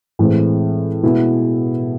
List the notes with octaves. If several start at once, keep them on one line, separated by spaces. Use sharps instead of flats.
A2 E3 G#3 C4
B2 G#3 B3 E4 G#4